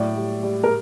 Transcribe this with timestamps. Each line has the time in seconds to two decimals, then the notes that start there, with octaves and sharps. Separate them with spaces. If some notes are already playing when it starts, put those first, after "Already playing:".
Already playing: A2 F#3 D5
0.16 G3
0.43 G3
0.64 A#4